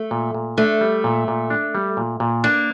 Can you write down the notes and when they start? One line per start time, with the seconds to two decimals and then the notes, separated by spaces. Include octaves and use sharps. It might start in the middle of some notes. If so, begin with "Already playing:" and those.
Already playing: A3
0.11 A#2
0.34 A#2
0.58 A3 D4
0.81 G3
1.04 A#2
1.28 A#2
1.50 D4
1.75 G3
1.97 A#2
2.20 A#2
2.44 A#3 D4